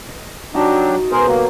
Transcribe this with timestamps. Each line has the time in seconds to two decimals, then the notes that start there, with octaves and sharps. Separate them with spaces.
0.09 D#5
0.54 F#3 D4 D#4 F#4 G4 A5
1.11 B2 G#4 A#4 C5
1.27 F#3 A#3 G4